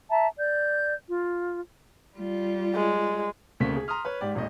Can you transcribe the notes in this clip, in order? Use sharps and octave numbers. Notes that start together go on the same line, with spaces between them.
E5 A5 A#5
D5 G6
F4
G3 F4
G#3
D2 C#3 A3 A#3 C4 B6
G#4
A#5 C6 D#6 F6
B4 C#5
G#2 G4 D5
D#1 G#1 D#2 D#5